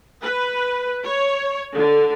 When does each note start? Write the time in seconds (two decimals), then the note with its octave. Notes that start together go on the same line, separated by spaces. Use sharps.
0.24 B4
1.05 C#5
1.74 D3